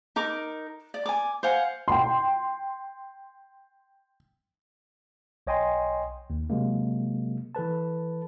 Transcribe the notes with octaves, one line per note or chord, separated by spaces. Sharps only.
D#4 A#4 D6
D5
G#5 D6
C5 F5 F#5 G#5
G5 C6
B1 C#5 D#5 G5 G#5 C6
D#2
C3 F#3 G#3 A#3
E3 A4 B4 A5